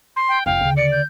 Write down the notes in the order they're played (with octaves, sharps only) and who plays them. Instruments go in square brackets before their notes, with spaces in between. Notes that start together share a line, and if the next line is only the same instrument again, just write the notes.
[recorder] C6
[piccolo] G5
[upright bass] F1 D#4 [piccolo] F5 [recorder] G5
[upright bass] D2 C#3
[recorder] D5 [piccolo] C#7
[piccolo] G6